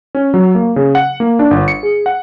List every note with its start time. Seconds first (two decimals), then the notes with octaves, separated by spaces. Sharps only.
0.15 C#4
0.34 F#3
0.55 A#3
0.76 C#3
0.95 F#5
1.20 A#3
1.39 D4
1.51 G1
1.68 C#7
1.83 G#4
2.06 F#5